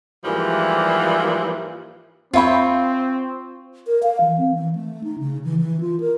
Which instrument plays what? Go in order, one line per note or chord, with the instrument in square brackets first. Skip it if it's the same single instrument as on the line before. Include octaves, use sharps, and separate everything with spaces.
[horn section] G#2 E3 F3 G3 A#3
[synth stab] F2 E5 B5 [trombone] C4 [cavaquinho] F4 C#5 G5
[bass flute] A#4
F5
E3
C4
E3
A3
D#4
C#3
E3
E3
F4
A#4